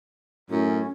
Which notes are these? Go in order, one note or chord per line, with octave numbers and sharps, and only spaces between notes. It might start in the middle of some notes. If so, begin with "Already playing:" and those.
F#2 A2 C#4